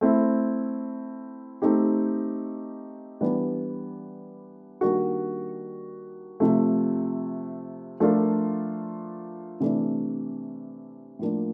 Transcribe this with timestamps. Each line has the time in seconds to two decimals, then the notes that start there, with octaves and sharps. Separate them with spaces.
0.01 A3 C4 E4
1.62 A3 C4 D#4 G4
3.21 E3 G3 B3 D4
4.81 D#3 G3 A#3 D4 F#4
6.40 C3 F3 A3
8.00 F3 A3 D4 F4 A#4
9.60 C3 E3 A3 D4
11.19 A2 F3 A#3 D4